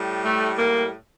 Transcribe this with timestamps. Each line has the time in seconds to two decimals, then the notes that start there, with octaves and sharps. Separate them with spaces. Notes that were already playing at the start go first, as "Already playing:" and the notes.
Already playing: A2 G3
0.23 A3
0.58 A#3